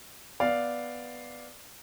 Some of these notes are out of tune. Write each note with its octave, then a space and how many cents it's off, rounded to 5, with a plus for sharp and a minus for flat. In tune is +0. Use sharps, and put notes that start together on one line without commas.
B3 +0 D5 +0 F5 +0